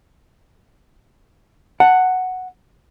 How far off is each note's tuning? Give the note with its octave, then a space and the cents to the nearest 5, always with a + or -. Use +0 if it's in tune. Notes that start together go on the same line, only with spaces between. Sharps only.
F#5 +0 A5 +30